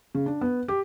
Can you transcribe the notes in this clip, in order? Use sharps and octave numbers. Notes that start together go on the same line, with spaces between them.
C#3
D4
B3
G4